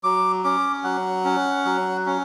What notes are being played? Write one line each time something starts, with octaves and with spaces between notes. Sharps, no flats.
F#3 D6
C#4 D6
F#3 F#5
C#4
F#3
C#4